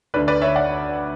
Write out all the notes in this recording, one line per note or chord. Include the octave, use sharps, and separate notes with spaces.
D2 D3 B4 D5
B4 D5
C#5 E5
D5 F#5